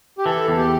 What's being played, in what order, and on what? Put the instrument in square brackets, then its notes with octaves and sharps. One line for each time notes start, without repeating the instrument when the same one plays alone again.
[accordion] G4
[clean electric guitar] E3 [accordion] A4
[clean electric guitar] E2
[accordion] G4